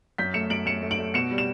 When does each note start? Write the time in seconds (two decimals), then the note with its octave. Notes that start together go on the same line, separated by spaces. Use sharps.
0.18 F#2 G6 B6
0.34 A3 C#7 E7
0.50 F#2 D7 F#7
0.66 F#2 C#7 E7
0.83 A3
0.91 D7 F#7
0.99 A3
1.14 B2 C#7 E7
1.31 G3
1.38 E7